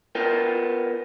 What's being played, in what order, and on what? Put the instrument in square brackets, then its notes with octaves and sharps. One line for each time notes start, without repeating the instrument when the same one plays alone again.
[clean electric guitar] B3 F4 A#4 G5